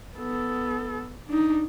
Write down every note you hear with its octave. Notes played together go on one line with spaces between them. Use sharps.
B3 A4
D4 D#4